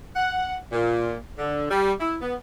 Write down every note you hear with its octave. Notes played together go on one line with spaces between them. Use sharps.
F#5
A#2
D3
G3
E4
B3